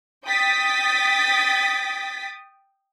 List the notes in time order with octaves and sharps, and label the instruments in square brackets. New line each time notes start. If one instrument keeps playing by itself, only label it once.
[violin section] G5 D#6 A6 B6